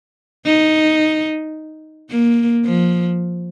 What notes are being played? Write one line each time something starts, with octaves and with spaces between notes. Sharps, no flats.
D#4
A#3
F3